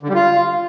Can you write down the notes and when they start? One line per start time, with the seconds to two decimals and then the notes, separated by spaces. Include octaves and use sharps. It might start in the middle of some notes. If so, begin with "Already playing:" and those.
0.03 D3
0.09 G3
0.15 F4